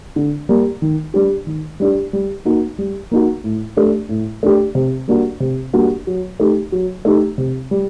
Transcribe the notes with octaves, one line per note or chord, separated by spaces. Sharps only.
D3
G3 A#3
D#3
G3 D4 G4
D#3
G3 D4 G4
G3
A#3 D#4 F#4
G3
A#3 D#4 F#4
A2
A3 D4 G4
A2
A3 D4 G4
C3
G3 A#3 D4 F#4
C3
G3 A#3 D4 F#4
F#3
A3 D#4 G4
F#3
A3 D#4 G4
C3
G3